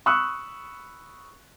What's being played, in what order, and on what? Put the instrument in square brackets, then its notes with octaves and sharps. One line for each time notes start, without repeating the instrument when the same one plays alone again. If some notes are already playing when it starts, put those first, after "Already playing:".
[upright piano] B5 C#6 D#6 E6 F#6